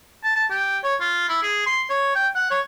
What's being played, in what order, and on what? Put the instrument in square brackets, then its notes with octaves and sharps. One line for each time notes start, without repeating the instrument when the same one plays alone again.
[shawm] A5
A5
G4
C#5
F4
E4
G#4
C6
C#5
G5
F#5
C#5